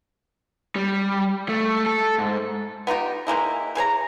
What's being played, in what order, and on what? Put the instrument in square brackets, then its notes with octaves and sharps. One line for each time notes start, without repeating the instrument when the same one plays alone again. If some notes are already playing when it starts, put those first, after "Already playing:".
[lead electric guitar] G3
A3
A4
G#2
[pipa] B3 D#4 F4 G4
D#3 G#3 A#3 E4
E3 G#4 C#5 A#5